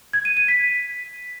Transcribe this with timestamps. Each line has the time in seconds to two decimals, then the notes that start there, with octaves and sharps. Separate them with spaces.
0.13 G#6
0.25 D#7
0.37 D#7
0.48 B6